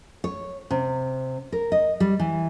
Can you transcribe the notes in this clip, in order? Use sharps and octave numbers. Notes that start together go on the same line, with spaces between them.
C#5
C3
A#4
D#5
G3
E3